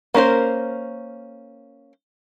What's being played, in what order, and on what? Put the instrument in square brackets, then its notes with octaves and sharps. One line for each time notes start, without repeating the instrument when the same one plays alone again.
[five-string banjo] A#3 C#4 A#4 C5